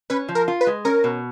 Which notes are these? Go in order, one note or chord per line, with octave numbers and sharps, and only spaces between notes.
C#4 B4
F3
A#4
F4
B4
G#3
C#4 A#4
B2